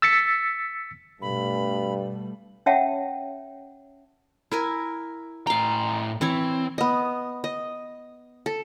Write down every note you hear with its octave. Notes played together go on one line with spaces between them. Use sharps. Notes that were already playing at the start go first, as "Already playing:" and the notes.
E6 A6 B6 C#7
G2 B2 G3 A3 B5
C#4 C#5 E5 F#5 G5 A5
E4 A#4 G#5
A2 F5 G5 A#5
E3 C4 E4 C#5
B3 D#5
D#5
A4